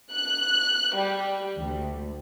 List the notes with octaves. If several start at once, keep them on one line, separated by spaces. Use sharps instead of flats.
F#6
G3
D2